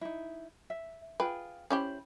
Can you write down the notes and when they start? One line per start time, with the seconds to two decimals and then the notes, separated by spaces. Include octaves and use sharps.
0.01 D#4 E4
0.70 E5
1.20 F4 G#4 B4 G5
1.70 C#4 E4 G4 C5 B5